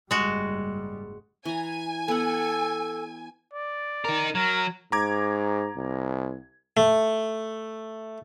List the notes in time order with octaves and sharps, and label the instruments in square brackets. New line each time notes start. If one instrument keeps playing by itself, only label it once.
[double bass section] F#1 G#2 G3 [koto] G#3 F#4
[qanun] E3 A#5 [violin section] G#5
[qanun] B3 F#5 [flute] A4
[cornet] D5
[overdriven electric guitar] D#4 A#4
[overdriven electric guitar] F#3 [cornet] A#4
[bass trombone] G#2 [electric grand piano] A#5 D6 G#6
[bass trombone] C2
[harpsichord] A3